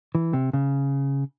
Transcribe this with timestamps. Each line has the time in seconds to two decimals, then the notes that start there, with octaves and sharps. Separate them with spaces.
0.15 E3
0.33 C3
0.53 C#3